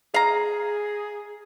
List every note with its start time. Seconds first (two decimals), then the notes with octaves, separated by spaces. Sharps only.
0.14 G#4 F5 A#5